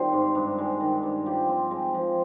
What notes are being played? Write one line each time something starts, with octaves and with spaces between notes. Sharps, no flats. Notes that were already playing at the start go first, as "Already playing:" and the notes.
Already playing: D#3 G3 C4 F4 C5
G#2
G2
G#3
D#3
G2
F3 G4
C4
G#3
F3